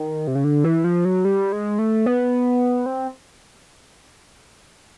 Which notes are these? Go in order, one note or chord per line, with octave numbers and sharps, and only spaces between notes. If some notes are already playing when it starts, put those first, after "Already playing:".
Already playing: D#3
C3
C#3
D3
E3
F3
F#3
G3
G#3
A3
B3
C4